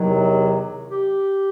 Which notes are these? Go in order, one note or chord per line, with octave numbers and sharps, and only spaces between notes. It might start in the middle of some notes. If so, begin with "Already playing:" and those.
Already playing: E2 C3 D#3 F#3
G4